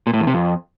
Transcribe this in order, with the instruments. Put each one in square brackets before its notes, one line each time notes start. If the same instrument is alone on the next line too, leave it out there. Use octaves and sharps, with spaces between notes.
[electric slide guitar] A#2
A2
E2
C3
F2